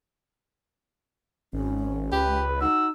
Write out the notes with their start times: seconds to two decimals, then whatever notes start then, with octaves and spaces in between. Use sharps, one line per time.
1.53 G#1 C#4
2.12 C#2 G4 B4
2.61 D#4 F#4 E6